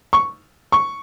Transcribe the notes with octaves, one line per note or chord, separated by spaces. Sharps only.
C#6
C#6